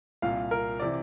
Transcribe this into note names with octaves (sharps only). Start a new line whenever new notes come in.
C2 A#2 F5
A#4
C3 E3 D5